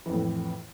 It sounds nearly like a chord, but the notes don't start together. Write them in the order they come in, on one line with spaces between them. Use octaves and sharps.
E3 F2 A2